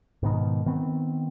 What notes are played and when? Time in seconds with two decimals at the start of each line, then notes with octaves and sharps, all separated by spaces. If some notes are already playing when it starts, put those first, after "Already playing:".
0.23 G#2 B2 D#3
0.66 D#3 B3 C4